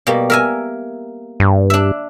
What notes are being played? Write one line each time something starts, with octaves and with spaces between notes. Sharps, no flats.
B2 G3 A#3
A#4 E5 G#5
G2
D4 E5